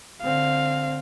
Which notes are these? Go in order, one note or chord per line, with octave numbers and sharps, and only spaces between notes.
D3 C4 F5